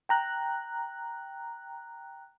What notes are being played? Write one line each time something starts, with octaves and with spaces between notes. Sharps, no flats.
G5 A#5 F#6